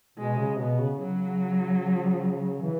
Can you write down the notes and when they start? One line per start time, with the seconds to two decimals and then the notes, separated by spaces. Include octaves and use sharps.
0.18 B2 G#3
0.39 C#3
0.59 B2 B3
0.80 C#3
0.99 C#3 F#3
2.62 E3